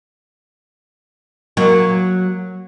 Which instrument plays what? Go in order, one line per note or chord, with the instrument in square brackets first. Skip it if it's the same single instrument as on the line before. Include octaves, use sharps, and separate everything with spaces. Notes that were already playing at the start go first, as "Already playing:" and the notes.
[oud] F#3 A#3